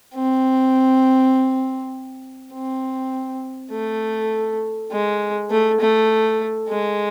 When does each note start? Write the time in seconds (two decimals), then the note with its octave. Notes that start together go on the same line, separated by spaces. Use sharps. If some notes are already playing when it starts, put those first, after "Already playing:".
0.14 C4
2.53 C4
3.71 A3
4.91 G#3
5.50 A3
5.80 A3
6.69 G#3